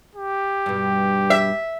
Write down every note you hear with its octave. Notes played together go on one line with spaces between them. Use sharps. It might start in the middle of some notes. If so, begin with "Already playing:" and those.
G4
G2 B2
E5